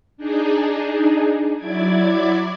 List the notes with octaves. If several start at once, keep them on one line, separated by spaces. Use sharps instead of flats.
D4 D#4 G#4
F#3 E4 D5 D6 G#6